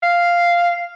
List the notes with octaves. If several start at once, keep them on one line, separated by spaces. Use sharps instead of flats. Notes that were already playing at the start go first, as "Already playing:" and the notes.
F5